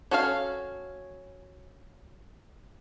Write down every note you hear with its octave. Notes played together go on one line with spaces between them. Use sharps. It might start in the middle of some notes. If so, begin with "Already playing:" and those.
C#4 F#4 A4 C#5 F5